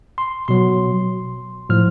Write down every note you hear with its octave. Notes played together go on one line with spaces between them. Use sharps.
C6
B2 F#3 C6
A2 F3 F6